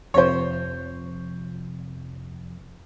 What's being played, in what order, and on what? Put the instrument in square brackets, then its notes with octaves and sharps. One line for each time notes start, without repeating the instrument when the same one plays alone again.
[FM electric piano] F2 C3 F3 [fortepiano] C5 C#5